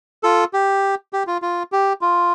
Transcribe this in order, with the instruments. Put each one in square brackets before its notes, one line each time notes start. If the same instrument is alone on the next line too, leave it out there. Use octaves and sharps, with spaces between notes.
[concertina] F4 A4
G4
G4
F4
F4
G4
F4